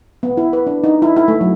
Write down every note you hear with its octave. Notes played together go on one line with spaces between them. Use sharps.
B3
E4
B4
D4
D#4
E4
E4
A3
F#3